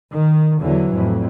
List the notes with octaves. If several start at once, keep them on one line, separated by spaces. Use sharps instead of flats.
D#3
E2 D3 E3 F#3
F2 A2